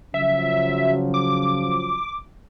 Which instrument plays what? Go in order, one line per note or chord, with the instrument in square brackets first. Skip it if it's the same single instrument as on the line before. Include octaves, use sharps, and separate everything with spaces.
[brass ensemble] C#3 F3 F#3 [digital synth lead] E5
[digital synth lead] D6